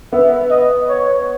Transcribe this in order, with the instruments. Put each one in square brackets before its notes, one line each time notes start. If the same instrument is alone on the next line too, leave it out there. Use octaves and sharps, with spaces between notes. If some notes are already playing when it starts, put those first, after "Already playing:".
[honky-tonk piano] B3 [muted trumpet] E5
[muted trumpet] D#5
C#5